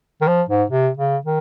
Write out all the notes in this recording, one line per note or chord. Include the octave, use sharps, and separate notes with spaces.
D#3
F3
G#2
C3
C#3
D#3